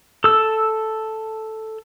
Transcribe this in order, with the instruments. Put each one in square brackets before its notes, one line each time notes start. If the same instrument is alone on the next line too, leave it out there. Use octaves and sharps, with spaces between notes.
[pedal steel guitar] A4 E6